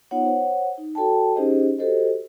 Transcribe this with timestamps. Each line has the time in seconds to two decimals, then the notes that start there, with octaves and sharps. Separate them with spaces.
0.11 B3 D#4 F4 C#5 F#5
0.24 C5 C#5 F#5
0.78 D#4
0.95 F#4 A4 C#5 G5 A5
1.35 C#4 D#4 G4 G#4 C5 D#5
1.78 F#4 G4 A4 C5 D#5